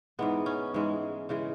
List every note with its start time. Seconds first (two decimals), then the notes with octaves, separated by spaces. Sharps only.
0.19 G#2 E3 G#3 B3
0.46 C#4
0.74 G#2 E3 G#3
1.29 C#3 E3 G#3